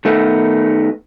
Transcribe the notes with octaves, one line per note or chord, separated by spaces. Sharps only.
D#3 A3 B3 D#4